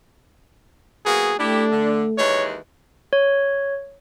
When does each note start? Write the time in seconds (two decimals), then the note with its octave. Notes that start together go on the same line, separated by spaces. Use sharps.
1.05 F#3 A#3 B3 G#4
1.39 A3 D4 E4 G4
1.71 D3
2.18 D#2 E3 G#3 C#5
3.13 C#5